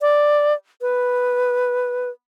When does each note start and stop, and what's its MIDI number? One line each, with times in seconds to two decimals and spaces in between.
0.01 0.54 74
0.82 2.10 71